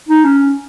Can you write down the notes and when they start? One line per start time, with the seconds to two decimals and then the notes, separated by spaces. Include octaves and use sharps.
0.09 D#4
0.24 C#4